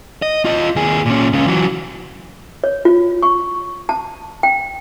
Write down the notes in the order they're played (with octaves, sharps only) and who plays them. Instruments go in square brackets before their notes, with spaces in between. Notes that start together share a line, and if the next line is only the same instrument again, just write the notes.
[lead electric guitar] D#5
F4 D#5
D#2 G#4
A#2 C#4
C#2 C#3
E3 F#3
[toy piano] C#5
F4
C#6
A5
G5